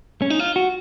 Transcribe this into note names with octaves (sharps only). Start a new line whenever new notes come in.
C#4
D#4
F4
F#4